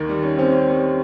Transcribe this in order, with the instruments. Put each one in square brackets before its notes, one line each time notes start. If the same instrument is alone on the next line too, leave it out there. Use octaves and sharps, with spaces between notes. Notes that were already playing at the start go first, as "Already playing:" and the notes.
Already playing: [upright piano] D#2 D#3
G3
C#4
[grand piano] C4 [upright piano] C#4
[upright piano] C#4
G3